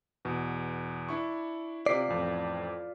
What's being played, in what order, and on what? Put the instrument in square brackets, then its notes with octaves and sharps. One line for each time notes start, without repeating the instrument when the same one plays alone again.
[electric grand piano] E2 B2
D4 E4 C#6
[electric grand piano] C3 B6 C7 [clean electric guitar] F4 D5
[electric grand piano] A1 F2